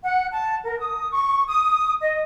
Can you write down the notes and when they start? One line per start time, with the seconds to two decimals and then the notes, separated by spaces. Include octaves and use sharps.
0.02 F#5
0.32 A5
0.65 A#4
0.79 D#6
1.11 C#6
1.47 D#6
2.01 D#5